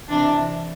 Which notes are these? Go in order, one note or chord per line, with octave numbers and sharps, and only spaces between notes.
C3 E3 D4